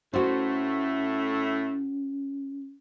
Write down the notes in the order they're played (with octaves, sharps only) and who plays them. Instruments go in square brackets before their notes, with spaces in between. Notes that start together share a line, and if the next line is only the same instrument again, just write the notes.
[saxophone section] A2 A3 [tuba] C#4 [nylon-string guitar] F#4 C5